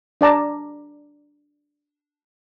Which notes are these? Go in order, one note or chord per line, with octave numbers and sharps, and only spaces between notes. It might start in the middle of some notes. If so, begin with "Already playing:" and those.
D4 D5 A5 A#5